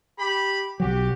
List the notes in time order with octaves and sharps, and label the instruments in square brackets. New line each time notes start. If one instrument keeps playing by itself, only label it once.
[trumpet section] G4 B5
[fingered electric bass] B1 F#3 [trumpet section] F#4 G4